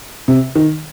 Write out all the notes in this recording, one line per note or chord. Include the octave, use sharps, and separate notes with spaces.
C3
D#3